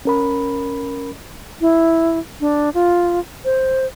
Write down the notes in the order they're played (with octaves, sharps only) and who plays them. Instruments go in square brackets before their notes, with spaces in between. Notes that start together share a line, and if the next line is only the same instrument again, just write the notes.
[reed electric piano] C#4 A#4 B5
[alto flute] E4
D4
F4
C5